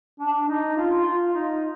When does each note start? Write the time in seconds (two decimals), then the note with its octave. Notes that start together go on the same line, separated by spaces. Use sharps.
0.20 D4
0.48 D#4
0.76 F4
1.05 F4
1.33 D#4